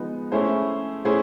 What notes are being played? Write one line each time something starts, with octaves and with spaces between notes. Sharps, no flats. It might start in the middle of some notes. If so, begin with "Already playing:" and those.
Already playing: F3 G#3 B3 D#4
A3 C#4 E4 G#4 C5
A3 C#4 E4 G#4 C5